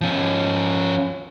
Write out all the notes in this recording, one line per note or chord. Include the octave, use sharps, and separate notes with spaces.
F3 C#4